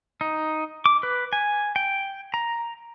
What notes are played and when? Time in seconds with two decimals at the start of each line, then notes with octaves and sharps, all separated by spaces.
0.21 D#4
0.86 D6
1.03 B4
1.33 G#5
1.76 G5
2.34 A#5